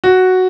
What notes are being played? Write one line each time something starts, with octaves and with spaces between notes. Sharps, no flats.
F#4